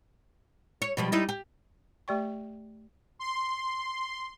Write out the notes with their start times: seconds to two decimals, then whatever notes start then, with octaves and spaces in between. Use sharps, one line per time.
0.82 C#5
0.97 B2 F3 G3
1.12 G3 D#4 E4
1.29 G4
2.08 A3 G4 D5 G5 C#6
3.19 C6